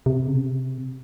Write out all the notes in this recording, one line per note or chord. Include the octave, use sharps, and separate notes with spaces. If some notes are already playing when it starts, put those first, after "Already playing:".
C3
C#3
C3